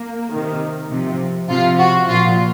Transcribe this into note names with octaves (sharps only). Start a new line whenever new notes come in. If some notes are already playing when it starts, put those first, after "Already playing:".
Already playing: A#3
C3 D#3
C3 F3
C3 F3 F4
F#4
A#2 F3 F4